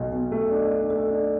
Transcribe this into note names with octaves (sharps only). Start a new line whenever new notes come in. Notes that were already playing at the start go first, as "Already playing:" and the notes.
Already playing: B1 B2
B2
A3
D4
D4
A3
D4